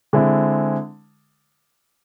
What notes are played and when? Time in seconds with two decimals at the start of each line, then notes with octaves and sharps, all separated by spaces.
0.13 D3 G#3 C4 E4